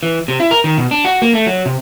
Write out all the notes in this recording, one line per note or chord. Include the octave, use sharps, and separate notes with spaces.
E3
C3
E4
A#4
D#3
B2
D4
F#4
A#3
A3
F#3
C3